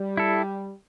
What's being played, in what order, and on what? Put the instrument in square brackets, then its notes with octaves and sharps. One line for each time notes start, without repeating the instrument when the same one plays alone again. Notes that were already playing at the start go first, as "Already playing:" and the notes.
Already playing: [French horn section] G3
[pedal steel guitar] E4 A4